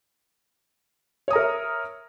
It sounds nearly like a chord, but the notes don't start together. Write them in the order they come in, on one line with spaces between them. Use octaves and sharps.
C#5 D#6 A#5 A#4 E5